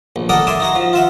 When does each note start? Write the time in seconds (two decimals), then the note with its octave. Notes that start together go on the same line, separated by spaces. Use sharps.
0.16 A#1
0.29 A4 A#4 D5 D#5 F#5 A#5
0.47 D5 E5 G#5 C6
0.60 D#4 F#4 F#5 A#5
0.75 F3
0.93 F4 E5 F#5